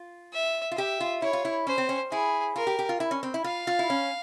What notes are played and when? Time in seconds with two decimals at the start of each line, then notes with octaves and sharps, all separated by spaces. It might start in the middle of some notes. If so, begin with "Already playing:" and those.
Already playing: F4
0.33 E5
0.71 F4
0.77 G4 E5
1.00 F4
1.22 E4 C#5
1.33 F4
1.45 E4
1.67 C#4 C5
1.78 C4
1.89 C#4
2.11 E4 G#4
2.56 F4 A#4
2.67 G4
2.79 G4
2.89 F4
3.00 E4
3.11 C#4
3.23 C4
3.34 E4
3.44 F4 F5
3.67 F4
3.79 E4
3.90 C#4